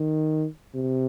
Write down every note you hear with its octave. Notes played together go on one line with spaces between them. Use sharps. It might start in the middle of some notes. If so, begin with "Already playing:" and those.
Already playing: D#3
C3